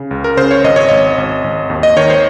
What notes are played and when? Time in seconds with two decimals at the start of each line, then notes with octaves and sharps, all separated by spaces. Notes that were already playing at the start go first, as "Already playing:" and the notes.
Already playing: C#3
0.11 C#2
0.24 A#4
0.37 C#3 C5
0.51 C#5
0.64 G#1 D#5
0.76 C#5
0.89 G#1 D#5
1.18 G#1
1.44 G#1
1.70 D#2
1.83 D#5
1.97 D#3 C#5
2.10 C5